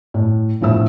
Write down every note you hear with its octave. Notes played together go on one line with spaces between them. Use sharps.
A2
E1 A#1 A2 E5 E6